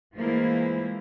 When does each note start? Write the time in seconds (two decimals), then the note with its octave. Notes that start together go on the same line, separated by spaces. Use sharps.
0.15 E3 F3 G#3 A#3 E4